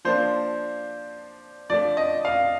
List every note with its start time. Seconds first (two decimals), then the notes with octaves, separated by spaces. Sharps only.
0.05 F3 A#3 D4 C5
1.70 F3 A3 D4 D5
1.97 D#5
2.25 F5